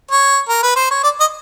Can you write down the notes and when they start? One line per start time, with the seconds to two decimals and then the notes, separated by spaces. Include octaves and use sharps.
0.11 C#5
0.49 A#4
0.63 B4
0.76 C5
0.91 C#5
1.04 D5
1.20 D#5